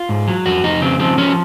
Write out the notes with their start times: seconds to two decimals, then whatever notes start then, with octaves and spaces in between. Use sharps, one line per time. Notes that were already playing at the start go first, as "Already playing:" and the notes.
Already playing: F4
0.09 G#2
0.28 F#3
0.46 F2 F#4
0.64 F2 D#4
0.81 C#3 C4
1.00 F3 C4
1.18 F3 C#4